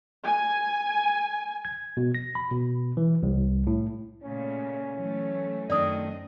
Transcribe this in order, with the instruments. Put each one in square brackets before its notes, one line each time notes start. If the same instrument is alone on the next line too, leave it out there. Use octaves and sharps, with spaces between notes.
[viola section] G#5
[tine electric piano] G#6
B2
A#6
B5
B2
E3
C2
A2
[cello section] A#2 C#3 A3 [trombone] C#4
[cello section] E3 F#3 A3
[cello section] F#2 C4 D#5 [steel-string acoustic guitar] D#3 A3 D4 [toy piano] D5 D#6